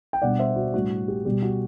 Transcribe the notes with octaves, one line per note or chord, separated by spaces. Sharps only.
G5
B2 G3 B3 D4 D5 F#5
C5 E5
F#4
A2 G3 D4 F#4
G4
B2 G3 B3 G4
F#4